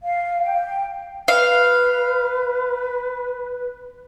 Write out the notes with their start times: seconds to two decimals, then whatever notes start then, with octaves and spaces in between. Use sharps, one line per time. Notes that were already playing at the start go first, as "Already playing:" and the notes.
0.01 F5
0.42 G5
1.28 B4 F5